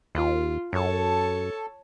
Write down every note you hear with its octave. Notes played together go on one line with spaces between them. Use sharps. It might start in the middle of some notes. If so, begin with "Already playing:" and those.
D#2 F4
F#2 A4 C#5 A5